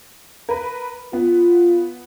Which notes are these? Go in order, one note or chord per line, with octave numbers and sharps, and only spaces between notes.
A#4 B4
B3 F4